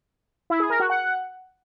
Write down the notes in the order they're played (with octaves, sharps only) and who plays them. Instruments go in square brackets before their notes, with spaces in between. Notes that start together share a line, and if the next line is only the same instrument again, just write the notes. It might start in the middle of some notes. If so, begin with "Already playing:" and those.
[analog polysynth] E4
G#4
A#4
F#4
F#5